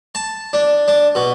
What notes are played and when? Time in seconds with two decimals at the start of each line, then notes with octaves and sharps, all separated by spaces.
0.15 A5
0.53 D4
0.88 D4
1.15 B2